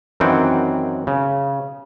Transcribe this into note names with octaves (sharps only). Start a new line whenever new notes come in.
F#2 D#3 E3 C4 F#5 G5
C#3